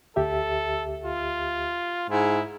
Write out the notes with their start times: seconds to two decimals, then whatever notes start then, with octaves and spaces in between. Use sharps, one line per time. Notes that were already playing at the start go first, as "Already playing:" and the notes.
0.16 D2 G4 A4 E5
1.04 F4
2.10 G#2 E4